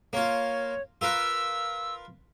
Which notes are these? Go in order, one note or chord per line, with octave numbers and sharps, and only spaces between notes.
A#3 F4 C#5
F4 A#4 B4 E6